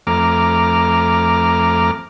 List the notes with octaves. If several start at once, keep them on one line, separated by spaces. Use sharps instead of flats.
F2 A3 A#5 D6 F6